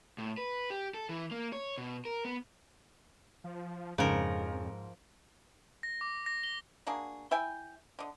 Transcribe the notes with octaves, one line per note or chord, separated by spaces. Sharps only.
A2
B4
G4
A4
E3
A#3
C#5
B2
A#4
B3
F3
F2 G#2 C#3 F3 A#4
A#6
D6
A#6
G7
A#3 D4 F#4 G#4
E4 E5 G5 G#5
D3 D#5